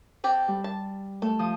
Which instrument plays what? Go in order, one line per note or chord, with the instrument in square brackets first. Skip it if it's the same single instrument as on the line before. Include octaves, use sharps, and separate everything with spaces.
[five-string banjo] C4 G4 A4
[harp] G3
[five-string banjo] A5
[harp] A3 [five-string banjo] A4
[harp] F3 D#6